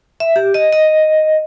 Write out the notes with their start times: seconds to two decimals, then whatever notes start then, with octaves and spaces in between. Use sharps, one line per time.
0.20 E5
0.36 G4
0.54 D#5
0.72 D#5